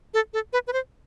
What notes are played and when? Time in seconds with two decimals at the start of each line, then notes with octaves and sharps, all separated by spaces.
0.14 A4
0.33 A4
0.53 B4
0.67 B4
0.73 C5